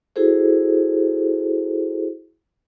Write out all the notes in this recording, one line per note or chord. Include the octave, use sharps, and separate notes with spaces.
E4 F#4 G#4 A4 C5